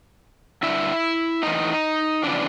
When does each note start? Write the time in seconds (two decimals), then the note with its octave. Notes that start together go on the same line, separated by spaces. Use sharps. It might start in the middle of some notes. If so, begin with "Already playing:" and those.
0.63 G2 D3 E4 E5
1.43 A2 E3 D#4 D#5
2.23 F2 C#3 E3 D4 D5